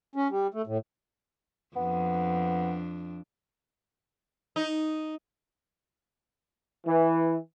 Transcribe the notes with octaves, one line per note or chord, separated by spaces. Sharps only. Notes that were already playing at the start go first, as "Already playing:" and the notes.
C#4
G3
A3
A2
F2 B3 D4
D#4
E3